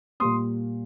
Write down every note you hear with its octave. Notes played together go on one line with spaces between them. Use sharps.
A#2 G3 A#3 C6 D#6